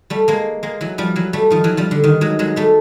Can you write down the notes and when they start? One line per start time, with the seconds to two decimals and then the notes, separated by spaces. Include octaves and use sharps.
0.10 G3 A3
0.28 G#3 A#3
0.63 G#3 A#3
0.81 E3 F#3
0.98 F3 G3
1.16 E3 F#3
1.33 G3 A3
1.50 D#3 F3
1.64 E3 F#3
1.77 F3 G3
1.91 D3
2.04 D#3
2.21 F#3 G#3
2.39 F#3 G#3
2.56 G3 A3